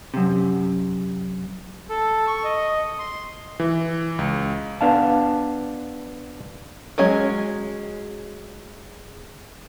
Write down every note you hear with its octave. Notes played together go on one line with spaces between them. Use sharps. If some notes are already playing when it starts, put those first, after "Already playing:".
F#2 C3
A4
C#6
D#5
C6
E3
C#2
B3 D4 F5 A5
F#3 G#3 C#4 G#4